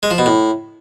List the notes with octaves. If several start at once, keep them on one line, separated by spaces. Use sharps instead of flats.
G#3
F3
B2
A2